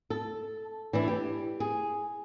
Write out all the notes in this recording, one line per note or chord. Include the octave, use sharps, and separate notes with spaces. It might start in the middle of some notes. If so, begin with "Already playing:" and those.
A4
E3 D4 E4
G4
G#4